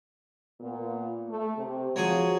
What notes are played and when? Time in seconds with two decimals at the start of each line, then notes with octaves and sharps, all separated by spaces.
0.61 A#2 B3
1.29 A3
1.58 C3
1.96 F3 F#3 G#4